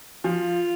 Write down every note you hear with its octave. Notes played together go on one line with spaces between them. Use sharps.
F3 F4